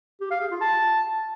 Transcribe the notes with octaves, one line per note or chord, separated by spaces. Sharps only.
G4
F5
G#4
F4
A5